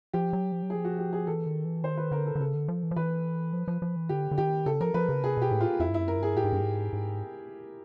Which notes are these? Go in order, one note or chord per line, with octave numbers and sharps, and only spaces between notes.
F3 G4
F#3
F3
F#3
F3 G#4
F#4
G4
G#4
E3 A4
D#3
E3
D#3 C5
B4
D3 A#4
A4
D3
C#3 A4
D3
F3
E3
F3
E3 B4
F3
F3
F3
E3
D3 G4
D3
D#3 G4
C#3 A4
F3 A#4
F3 B4
C#3
C3 G#4
B2 G4
A2
F4
F2 E4
G2
F#2 E4
A#4
G2
G#4
A2 G4
G#2
G2
G#2
G#2